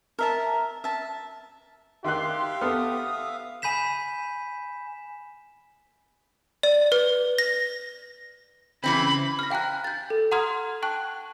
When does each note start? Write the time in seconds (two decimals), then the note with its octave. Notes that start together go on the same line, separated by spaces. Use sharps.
0.19 A#4 E5 A5
0.84 E5 A5
2.04 D#3 G4 E5 F5 C6 F#6
2.61 B3 A4 D#6 F6
3.62 G#5 B5 G6 B6 E7
6.63 D5
6.92 B4
7.38 A#6
8.84 C#3 E3 C4 B5
9.39 F6 A#6
9.50 F5 G5 G#5 A#5 F#6
9.84 G6 A6
10.10 A4
10.31 F#5 A#5 C6 D#6 F6 G#6
10.82 G5 A5 C#6 F#6